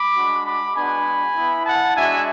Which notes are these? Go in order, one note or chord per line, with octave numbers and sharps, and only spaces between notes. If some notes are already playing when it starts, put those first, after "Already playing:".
Already playing: B5 D6
G#3 D4 F#4
B5 D6
G#3 B3 D4 F#4 G#5 B5
B3 E4
F#5 A5
G#3 D4 F#4 E5 G#5